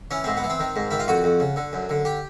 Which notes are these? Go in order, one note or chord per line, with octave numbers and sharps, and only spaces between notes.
E3 C#4
G#2 C4
B3
E3
C4
D#3
G#2
D#3 E4
F4
F2 F#4
F2
C#3
D3
F#2
D3
G4